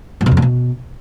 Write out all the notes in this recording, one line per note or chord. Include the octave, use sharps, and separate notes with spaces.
G#2
B2
F2
A#2
B2